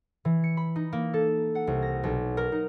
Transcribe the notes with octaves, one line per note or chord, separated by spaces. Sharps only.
E3
C#7
B5
D#4
A#3
A4
F#5
C2
A#6
B1
A#4
D#4